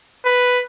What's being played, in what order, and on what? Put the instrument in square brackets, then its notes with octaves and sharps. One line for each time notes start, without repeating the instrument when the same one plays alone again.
[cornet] B4